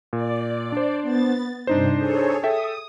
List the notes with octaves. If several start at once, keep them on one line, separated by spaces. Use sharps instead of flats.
A#2 D5
D4 C5
B3 A6
G2 C3 D4 D#4 C5
G#4 A4 C#5
A4 E5 G5 D#6